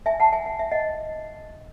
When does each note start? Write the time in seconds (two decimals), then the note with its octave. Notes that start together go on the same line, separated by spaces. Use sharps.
0.06 E5 G#5
0.20 F#5 A5
0.32 E5 G#5
0.46 F#5
0.59 E5
0.71 D#5 F#5